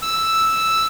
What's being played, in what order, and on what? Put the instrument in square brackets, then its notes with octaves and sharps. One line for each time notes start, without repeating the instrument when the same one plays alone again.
[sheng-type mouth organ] E6